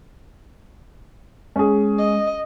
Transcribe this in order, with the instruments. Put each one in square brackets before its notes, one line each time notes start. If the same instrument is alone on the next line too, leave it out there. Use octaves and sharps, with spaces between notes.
[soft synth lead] G#3 [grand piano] C#4 G#4
[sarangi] D#5